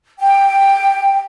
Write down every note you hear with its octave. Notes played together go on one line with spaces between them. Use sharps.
G5